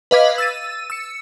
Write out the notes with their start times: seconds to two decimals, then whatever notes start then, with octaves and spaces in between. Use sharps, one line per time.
0.11 B4 D#5 F5 D6 G#6 B6
0.38 E6 A6 D#7
0.90 E6 C#7